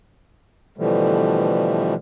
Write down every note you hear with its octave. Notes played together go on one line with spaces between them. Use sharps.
B2 D3 E3 F3 G3 A3